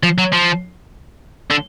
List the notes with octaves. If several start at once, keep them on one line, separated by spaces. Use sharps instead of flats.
F3
F#3
F3
D3